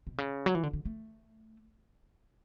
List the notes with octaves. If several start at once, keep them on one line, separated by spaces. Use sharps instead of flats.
B2
C#3
F#3
E3
D3
D3
A3